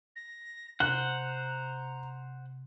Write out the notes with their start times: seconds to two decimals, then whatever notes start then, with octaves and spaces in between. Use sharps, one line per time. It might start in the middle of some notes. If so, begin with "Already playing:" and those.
0.16 A#6
0.80 C3 C5 F#5 A#5 F#6